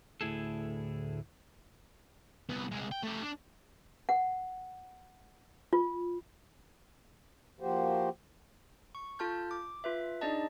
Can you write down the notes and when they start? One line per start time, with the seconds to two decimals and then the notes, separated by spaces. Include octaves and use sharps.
0.21 D2 A2 E4 G#4 A4
2.49 C2 B3
2.71 C2 G#3
2.92 G5
3.03 A3 G4
3.22 D4
4.09 F#5
5.73 F4
7.60 F3 A#3 F#4 G4 C5
8.95 C#6
9.19 F4 A4 A5 F6 G6
9.51 D6
9.84 F4 B4 E5
10.21 D4 D#4 G#4 D5 D#5 A5